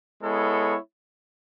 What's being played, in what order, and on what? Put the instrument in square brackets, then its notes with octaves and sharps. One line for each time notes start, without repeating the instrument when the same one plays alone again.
[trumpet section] G#3 B3 E4 A4 C#5